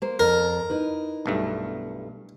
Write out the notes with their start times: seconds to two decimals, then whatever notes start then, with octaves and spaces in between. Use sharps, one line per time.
0.02 A#3 C5
0.19 F2 A#4
0.70 D#4 E4 B4
1.26 B1 G2 A3